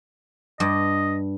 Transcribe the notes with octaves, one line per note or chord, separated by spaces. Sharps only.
G2 D#5